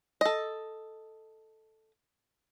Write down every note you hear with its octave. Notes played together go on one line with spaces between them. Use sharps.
A4 D#5